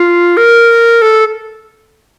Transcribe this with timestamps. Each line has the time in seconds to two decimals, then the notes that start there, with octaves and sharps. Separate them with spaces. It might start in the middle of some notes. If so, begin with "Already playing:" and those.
Already playing: F4
0.37 A#4
1.02 A4